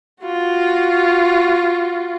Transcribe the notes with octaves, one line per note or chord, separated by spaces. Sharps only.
F4 F#4